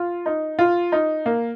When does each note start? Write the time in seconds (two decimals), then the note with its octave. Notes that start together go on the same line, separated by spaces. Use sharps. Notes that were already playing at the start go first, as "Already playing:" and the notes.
Already playing: F4
0.26 D#4
0.59 F4
0.92 D#4
1.26 A#3